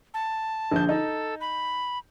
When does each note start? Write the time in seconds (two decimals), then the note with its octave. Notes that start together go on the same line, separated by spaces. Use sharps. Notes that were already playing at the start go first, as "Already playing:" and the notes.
0.14 A5
0.71 A#1 D3 G6
0.89 D#4 A4
1.41 B5